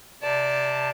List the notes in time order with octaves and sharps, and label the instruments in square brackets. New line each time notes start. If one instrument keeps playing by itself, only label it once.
[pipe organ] C3 A5 [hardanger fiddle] D5